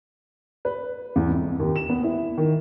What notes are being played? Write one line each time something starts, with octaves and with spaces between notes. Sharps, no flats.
B4
E2
F2
D#2
E7
B3
E4
D#3